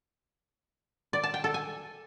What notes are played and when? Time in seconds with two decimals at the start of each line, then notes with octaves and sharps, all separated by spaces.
1.13 D5
1.23 A5
1.34 G5
1.44 A4
1.54 G#5